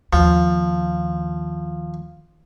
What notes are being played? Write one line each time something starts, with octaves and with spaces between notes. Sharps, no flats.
D#2 F3